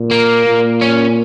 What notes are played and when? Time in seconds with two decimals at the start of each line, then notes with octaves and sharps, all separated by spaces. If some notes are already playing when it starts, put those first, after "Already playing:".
Already playing: A#2
0.11 A#3
0.46 A#2
0.81 C#4